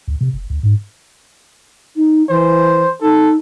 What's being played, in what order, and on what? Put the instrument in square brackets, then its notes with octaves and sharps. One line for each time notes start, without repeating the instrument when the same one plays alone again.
[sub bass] D2
C3
F1
D2
G#2
[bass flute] D#4
[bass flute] E3 [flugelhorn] C5
[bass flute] D#4 [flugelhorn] A4